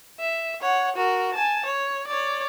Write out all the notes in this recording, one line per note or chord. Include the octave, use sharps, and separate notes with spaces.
E5
C#5 F#5
F#4 A#4
G#5 A5
C#5
C#5 D5